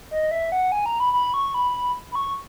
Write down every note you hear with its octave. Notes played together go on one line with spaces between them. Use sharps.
D#5
E5
F#5
G#5
A#5
B5
B5
C#6
B5
B5
C#6